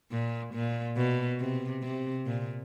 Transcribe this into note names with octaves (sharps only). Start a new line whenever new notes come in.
A#2
A#2
B2
C3
C3
A#2